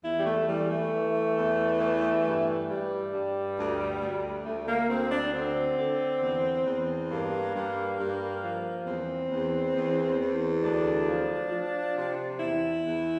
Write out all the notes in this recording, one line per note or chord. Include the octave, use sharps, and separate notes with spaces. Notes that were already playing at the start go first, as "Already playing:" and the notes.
E2 E4
G3
A3
E3 G3
A3
E3
E2
E3
G2
G2 G3
G2
D2
D2
D2 A3
A#3
D2 C4
D4
D3 C4
D3
E2
E2
G2 A#3
G2
G2
F3
E2 C4
E2
E2
E2
D2 D4
F3
F3
C3
E2 E4
E2